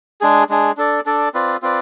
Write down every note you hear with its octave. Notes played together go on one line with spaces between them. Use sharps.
G#3 D4 G#4
G#3 D4 G#4
D4 A4 D5
D4 A4 D5
C4 F4 B4 D5
C4 F4 B4 D5